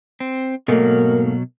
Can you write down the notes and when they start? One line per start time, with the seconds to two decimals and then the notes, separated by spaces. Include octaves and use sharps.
0.20 C4
0.68 G#2 B2 F#3 A3 A#3 A#4